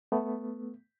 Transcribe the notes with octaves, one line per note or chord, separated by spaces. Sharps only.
A3 B3